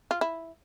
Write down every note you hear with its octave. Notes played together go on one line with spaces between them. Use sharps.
F4
E4